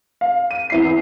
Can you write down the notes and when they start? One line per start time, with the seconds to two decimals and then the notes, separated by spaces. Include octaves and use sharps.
0.21 F5
0.51 D#7
0.70 E2 E4 C7